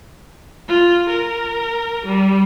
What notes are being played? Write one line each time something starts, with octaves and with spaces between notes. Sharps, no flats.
F4
A#4
G3